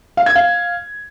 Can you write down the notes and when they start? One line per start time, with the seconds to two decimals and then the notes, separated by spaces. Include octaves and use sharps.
0.17 F5
0.26 G#6
0.35 F5